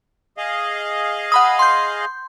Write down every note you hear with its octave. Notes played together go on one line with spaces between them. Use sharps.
G#4 D#5 F5
F#5 B5 D#6
C6 G6